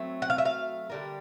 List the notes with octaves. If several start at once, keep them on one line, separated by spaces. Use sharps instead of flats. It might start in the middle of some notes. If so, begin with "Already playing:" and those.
Already playing: F#3 A3 C4
F#5
F5
E5
F5
D3 G3 A#3